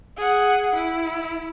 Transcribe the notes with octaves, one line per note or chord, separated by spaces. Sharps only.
G#4 F#5
E4